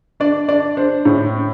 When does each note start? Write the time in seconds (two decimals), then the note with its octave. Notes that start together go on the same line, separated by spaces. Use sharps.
0.20 D4 D5
0.48 D4 D5
0.77 D4 C5
1.05 A2